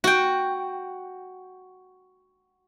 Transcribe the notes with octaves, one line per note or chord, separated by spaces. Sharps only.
F#4 G5